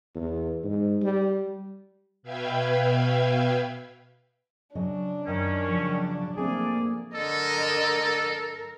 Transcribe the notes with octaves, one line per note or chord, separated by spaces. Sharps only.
E2
G#2
G3
B2 B4 E5 F5 G5 G#6
C#3 F#3 D4 D#5
F#2 D#3 C#4
C#3 F3 F#3
F3 A3 A#3 C4 E4 G#4 D5
D3 A4 A#4 D#5